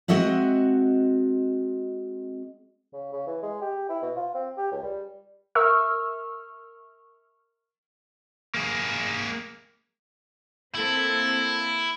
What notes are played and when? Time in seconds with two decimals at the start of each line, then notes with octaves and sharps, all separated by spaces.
0.08 G#3 C4 F#4 D#5 E5 F#5
2.93 C#3
3.13 C#3
3.27 E3
3.43 G#3
3.61 G4
3.90 E4
4.02 B2
4.16 F4
4.35 C4
4.58 G4
4.72 C#2
4.83 G3
5.55 A#4 E5 C#6 E6 F6
8.54 A#3 G#4
10.75 A#3 C4 E4 A4